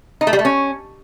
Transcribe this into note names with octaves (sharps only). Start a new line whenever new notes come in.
D#4
A3
G3
A3
C#4